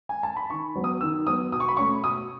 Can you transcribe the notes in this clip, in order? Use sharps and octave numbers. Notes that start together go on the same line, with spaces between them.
G#5
A5
B5
D#3 C#6
F#3 B3
D#6
D#3 E6
F#3 B3 D#6
B2 D#6
C#6
B5
A3 C#4 C#6
B2 D#6